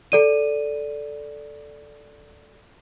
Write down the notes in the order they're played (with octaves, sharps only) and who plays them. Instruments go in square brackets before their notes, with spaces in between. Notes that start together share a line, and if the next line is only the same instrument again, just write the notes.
[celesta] A4 D5 D#7